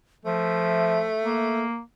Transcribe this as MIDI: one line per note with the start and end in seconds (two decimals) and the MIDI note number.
0.25 1.07 53
0.25 1.64 57
0.25 1.34 76
1.25 1.81 58